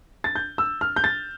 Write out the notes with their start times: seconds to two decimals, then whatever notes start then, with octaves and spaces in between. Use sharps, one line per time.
0.24 A6
0.35 G6
0.58 E6
0.81 F6
0.96 G6
1.04 A6